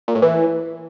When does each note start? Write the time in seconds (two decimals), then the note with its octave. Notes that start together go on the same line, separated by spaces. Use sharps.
0.08 A#2
0.15 A2
0.22 E3